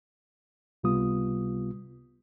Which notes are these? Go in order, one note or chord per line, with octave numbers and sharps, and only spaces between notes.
C#2 C3 G3 B3 F4 D#6